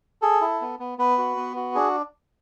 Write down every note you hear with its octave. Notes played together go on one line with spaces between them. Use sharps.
G#4 A4
E4
B3
B3
B3 B4
F#4
B3
F#4
D4 G#4